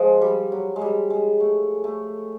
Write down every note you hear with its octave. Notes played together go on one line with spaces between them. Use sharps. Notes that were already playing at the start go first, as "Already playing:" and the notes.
Already playing: F3 G#3
G3
F#3
G#3
G3
G#3
A3
A3